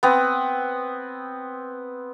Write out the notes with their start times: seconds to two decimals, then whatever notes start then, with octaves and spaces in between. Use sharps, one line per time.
0.03 B3 C4